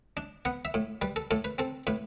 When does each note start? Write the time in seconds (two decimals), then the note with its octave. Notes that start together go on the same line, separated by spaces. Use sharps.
0.17 D4
0.45 B3 F#5
0.65 E5
0.74 A2
1.02 G3 B4
1.16 A4
1.31 A2 A4
1.44 B4
1.58 C4 A4
1.87 A2 B4